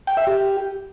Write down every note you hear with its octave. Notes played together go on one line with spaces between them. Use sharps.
G5
E5
G4